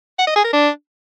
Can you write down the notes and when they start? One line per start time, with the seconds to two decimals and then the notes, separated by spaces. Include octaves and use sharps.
0.18 F#5
0.27 D#5
0.36 G#4
0.44 A#4
0.53 D4